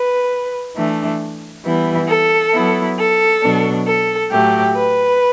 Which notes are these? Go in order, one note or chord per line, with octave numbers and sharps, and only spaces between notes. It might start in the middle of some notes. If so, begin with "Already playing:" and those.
Already playing: B4
E3 A3 D4
E3 G3 B3 E4
A4
F#3 B3 E4
A4
B2 F#3 B3 D4
A4
A2 F#3 A3 G4
B4